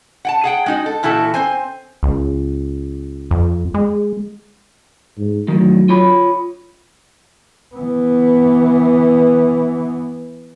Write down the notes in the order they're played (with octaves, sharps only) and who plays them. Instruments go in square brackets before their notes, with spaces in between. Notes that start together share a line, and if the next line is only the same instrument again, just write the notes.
[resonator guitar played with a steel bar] F#5 G5 A5
G#4 F#5 G5
G#3 D#4 F#4
A4
A#2 E3 E4 F#4 A4
C4 C5 G#5
[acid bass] C#2
F2
G#3
[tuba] G#2
[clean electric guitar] A2 D#3 [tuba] F#3
[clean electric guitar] F4 C#5 B5
[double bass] E3 B3